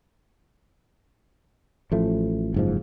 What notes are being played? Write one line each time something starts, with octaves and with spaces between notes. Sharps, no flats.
A1 F3 A3
F#1 G#2 F3